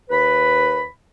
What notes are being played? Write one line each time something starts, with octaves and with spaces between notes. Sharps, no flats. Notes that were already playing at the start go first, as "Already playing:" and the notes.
D#2 B4 B5